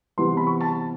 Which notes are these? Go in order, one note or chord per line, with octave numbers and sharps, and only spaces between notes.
C3 E3 G3 B3 C6
B5
C#6
A5